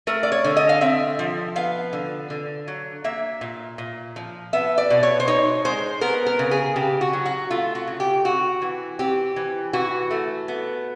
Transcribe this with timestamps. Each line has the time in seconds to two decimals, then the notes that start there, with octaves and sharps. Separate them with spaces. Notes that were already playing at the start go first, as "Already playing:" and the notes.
0.07 A3 A#4
0.23 D5
0.32 C#5
0.44 D3
0.57 D#5
0.69 F5
0.81 C4 E5
1.19 F3
1.56 B3 F5
1.93 D3
2.30 D3
2.68 F#3
3.04 A#3 E5
3.41 A#2
3.78 A#2
4.16 F3
4.53 B3 E5
4.78 D5
4.90 B2
5.03 C#5
5.20 C5
5.27 D#4 C#5
5.65 G#3 C5
6.01 B3 A#4
6.27 A#4
6.39 C#3
6.51 G#4
6.76 C#3 G4
7.01 F#4
7.13 F#3
7.26 F#4
7.50 A3 F4
7.75 F#4
7.87 C#3
8.00 G4
8.25 C4 F#4
8.62 E3
8.99 C4 G4
9.36 E3
9.73 E3 F#4
10.11 A3
10.48 B3